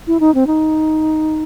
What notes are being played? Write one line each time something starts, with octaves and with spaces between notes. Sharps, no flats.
E4
D#4
C4
D#4